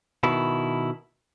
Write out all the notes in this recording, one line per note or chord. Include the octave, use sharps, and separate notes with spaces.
B2 D#3 E4